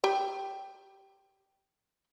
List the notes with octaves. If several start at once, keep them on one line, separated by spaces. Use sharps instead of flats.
G4 G5